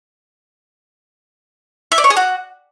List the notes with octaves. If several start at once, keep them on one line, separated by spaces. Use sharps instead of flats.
E5
D5
C#5
G#4
F#4